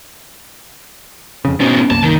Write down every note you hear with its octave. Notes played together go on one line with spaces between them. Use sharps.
F1 F2 C#3
G#2 B2 C#4
C2 F#2 A#3 A5
D#3